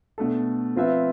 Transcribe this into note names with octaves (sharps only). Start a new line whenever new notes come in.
B2 A3 D4 A4
F3 C4 F4 B4 E5